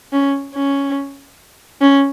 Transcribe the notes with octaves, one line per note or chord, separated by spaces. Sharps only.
C#4
C#4
C#4